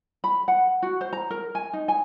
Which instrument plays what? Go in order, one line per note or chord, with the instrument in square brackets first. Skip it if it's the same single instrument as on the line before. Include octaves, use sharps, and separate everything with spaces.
[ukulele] B5
F#5
F#4
C5
A#5
A#4
G#5
D#4
G#5